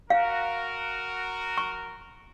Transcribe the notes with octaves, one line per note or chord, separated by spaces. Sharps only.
F#4 A#4 F5
C#6